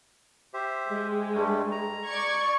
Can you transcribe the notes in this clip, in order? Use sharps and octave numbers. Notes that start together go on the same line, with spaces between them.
G4 C5 E5
G#3
G2 G3 A3
A#5
D5 C#6 G#6